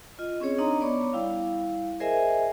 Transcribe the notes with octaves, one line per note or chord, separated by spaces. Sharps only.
F4 D#5
C4 C#4 G#4 C#5
D4 D#4 D#5 A#5 C6
B3 C#5 D5 B5 C#6 D6
G3 E4 F5
G#4 A#4 C5 D#5 E5 G#5